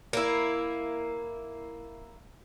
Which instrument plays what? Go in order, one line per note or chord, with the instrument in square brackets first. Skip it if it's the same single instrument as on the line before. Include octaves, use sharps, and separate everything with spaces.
[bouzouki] A#3 E4